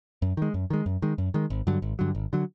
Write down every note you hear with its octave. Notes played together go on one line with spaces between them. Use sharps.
F#2
D#3 G#3
F#2
D#3 G#3
F#2
D#3 G#3
F#2
D#3 G#3
G#1
G2 D3 F#3
G#1
G2 D3 F#3
G#1
D3 F#3